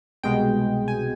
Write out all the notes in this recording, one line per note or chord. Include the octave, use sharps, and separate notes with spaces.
C2 B2 G#3 G5
G#5